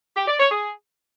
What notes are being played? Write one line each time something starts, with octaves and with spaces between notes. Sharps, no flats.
G4
D5
C#5
G#4